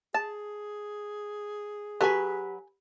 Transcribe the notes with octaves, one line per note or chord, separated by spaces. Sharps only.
G#4 A5
F#3 G4 A4 B4 G#5 B6